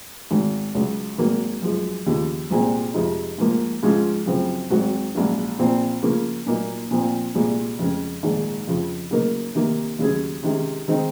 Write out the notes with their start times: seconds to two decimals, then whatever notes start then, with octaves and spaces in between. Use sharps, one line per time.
0.31 G#1 G#2 D#3
0.75 C#2 C#3 F#3
1.18 G#1 G#2 F#3 A#3
1.62 F#2 F3 G#3
2.06 D#2 C#3 F3
2.50 C2 A#2 G#3 C4
2.94 F2 C3 F3 G#3 D#4
3.38 G#2 F3 A#3
3.83 G#2 F3 G#3 C#4 F4
4.26 F#2 C#3 F3 C4
4.70 G#1 G#2 F#3 C4 F#4
5.15 A#1 G#2 F#3 C#4
5.59 A#1 A#2 F3 C4
6.02 C#3 F3 A#3 C#4
6.46 A#2 F#3 A#3 D#4
6.91 A#2 F3 C4
7.35 C2 A#2 G#3
7.78 F2 C#3 G#3 C#4
8.23 A#1 G#2 D#3 G#3
8.67 F2 C#3 F3
9.11 C#3 F#3 A#3 D#4 A#4
9.55 C3 D#3 A#3
9.99 D#2 C#3 F#3 C#4 G#4
10.43 C3 D#3 G#3 C#4
10.88 D#3 G#3 C4 D#4